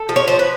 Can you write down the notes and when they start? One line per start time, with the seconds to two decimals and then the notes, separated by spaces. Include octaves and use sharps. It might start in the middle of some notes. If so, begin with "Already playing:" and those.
Already playing: A4
0.09 F3
0.16 C#5
0.28 F3 C5
0.39 B4